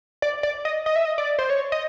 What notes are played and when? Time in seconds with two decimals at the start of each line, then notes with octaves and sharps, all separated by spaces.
0.22 D5
0.43 D5
0.65 D#5
0.86 D#5
0.96 E5
1.05 D#5
1.18 D5
1.39 C5
1.50 C#5
1.72 D#5